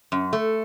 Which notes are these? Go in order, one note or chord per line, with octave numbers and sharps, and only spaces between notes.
F#2
A3